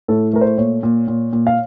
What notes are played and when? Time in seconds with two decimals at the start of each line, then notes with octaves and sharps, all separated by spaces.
0.08 A2 A4
0.33 A3 A#4
0.41 C5
0.58 A#2 C#5
0.83 A#2
1.08 A#2
1.33 A#2
1.47 F5